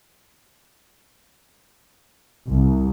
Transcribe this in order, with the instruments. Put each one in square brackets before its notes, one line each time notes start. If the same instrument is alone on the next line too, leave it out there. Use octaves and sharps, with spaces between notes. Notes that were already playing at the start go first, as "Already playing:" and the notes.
[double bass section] C2